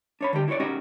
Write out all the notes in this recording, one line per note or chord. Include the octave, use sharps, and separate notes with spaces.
D4 C#5 B5
D3 G3 G4
E4 F#4 A4 C#5 D5
B1 C#4 D#4 F#4 G4 D#5